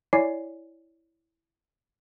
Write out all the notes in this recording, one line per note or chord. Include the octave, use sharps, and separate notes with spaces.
E4 C#5 D5 G#5 D6 C7